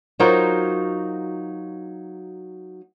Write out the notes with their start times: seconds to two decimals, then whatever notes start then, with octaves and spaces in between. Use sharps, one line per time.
0.20 F#3 D#4 F4 F#4 A#4 C5